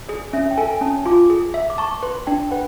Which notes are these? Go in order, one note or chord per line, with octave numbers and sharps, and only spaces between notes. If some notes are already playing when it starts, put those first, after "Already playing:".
G#4 D5
C#4 E5
G5
A4 G#5
C#4 A5
F4 D6
G#4
E5
D6
A5 C#6
B4 C6
D4 G5
B4 F#5